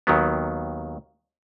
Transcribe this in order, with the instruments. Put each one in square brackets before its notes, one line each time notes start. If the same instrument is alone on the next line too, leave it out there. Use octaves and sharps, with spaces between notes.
[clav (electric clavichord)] D#2 D#3 F#3 B3